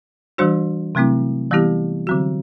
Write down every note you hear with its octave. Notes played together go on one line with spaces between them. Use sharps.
E3 G3 D4 F#4 C5
C3 F#3 A3 C4 E4
E3 G3 B3 E4 G4
D3 F#3 C4 F#4